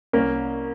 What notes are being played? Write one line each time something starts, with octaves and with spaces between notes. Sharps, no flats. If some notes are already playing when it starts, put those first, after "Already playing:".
C2 A#3 C#4